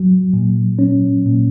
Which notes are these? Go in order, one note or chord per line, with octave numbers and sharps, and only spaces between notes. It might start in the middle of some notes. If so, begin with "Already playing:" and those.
Already playing: F#3
A#2
C#4
A#2